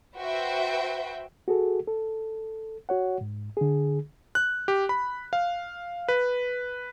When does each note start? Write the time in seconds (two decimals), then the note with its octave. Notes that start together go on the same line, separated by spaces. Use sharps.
0.16 F#4 B4 C5 E5 G5
1.48 F#4 G#4 A4
1.87 A4
2.89 F#4 C#5 F#5
3.21 G#2
3.57 D3 G#4
4.35 F#6
4.68 G4
4.89 B5
5.33 F5
6.09 B4